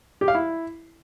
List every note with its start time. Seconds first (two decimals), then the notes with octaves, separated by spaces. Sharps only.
0.21 G4
0.28 F5
0.35 E4